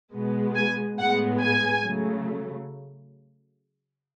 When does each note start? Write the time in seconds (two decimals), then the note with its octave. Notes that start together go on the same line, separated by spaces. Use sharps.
0.13 B2 G#3 B3
0.55 G#5
0.99 A2 G#3 B3 F#5
1.40 G#5
1.83 C#3 F#3 A3